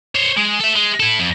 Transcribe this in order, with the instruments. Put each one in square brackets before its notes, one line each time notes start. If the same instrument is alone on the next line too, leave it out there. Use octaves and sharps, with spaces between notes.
[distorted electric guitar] C5 C#5
G#3
A4 E5
G#3
E4 A4
F2